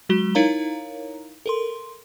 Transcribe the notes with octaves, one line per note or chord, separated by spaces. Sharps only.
F#3 G#3 F#4 G7
D#4 E4 A#4 C#5 F5 A#5
A4 A#4 C6